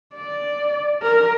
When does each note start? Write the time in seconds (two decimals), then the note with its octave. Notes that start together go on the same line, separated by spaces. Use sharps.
0.15 D5
1.02 A#4